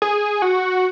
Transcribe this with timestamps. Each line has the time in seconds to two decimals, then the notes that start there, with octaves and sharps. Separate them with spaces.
0.02 G#4
0.42 F#4